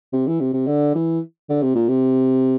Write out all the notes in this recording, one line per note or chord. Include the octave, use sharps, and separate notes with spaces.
C3
E3
C3
C3
D3
E3
D3
C3
A#2
C3